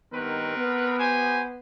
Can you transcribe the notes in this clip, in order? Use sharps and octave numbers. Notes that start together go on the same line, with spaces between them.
G2 D#3 B3 C4 A#4 B4
B3
G4 C5 G#5